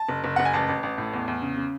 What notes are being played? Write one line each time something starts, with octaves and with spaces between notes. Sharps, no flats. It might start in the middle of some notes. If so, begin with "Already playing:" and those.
Already playing: A5
F#1
F#1
F#1 F#5
G#5
A1 A5
A1
A1
A2
E2
E2
C#3
C#3